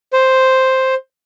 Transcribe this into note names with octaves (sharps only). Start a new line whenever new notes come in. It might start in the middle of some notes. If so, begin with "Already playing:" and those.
C5